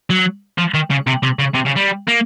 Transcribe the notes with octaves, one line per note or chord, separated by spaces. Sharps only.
F#3
F3
D#3
C#3
C3
C3
C#3
C3
C#3
G3
A#3